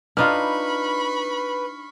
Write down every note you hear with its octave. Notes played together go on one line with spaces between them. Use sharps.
D4 D#4 F4 B4 B5 C#6 F6